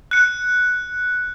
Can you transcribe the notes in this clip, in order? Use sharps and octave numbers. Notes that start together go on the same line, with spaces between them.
F#6 C#7